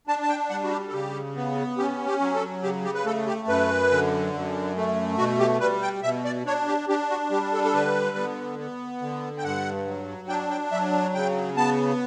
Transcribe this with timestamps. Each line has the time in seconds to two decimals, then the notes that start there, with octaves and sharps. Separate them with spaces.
0.07 D4 A5
0.22 A5
0.29 G5
0.50 G3 F#5
0.64 F#4
0.71 G4
0.89 A4
0.92 C#3 G4
1.36 B3
1.78 C#4 G4
2.06 G4
2.20 F#3
2.35 A4
2.63 C#3 G4
2.84 G4
2.95 B4
3.05 A3 A4
3.27 G4
3.48 F#2 B4
3.91 D3
4.34 F#2
4.76 A3
5.18 B2 F#4
5.40 G4
5.60 G3 B4
5.82 G5
6.03 B2 E5
6.25 D5
6.46 D4 C#5
6.67 G4
6.89 D4 G4
7.10 F#4
7.31 G3 G4
7.53 A4
7.65 A4
7.73 D3 B4
8.17 B3
8.59 B3
9.02 D3
9.38 G5
9.43 G2 F#5
9.87 F#3
10.29 D4 G5
10.51 G5
10.72 F#3 E5
11.14 C#3 G5
11.56 B3 A5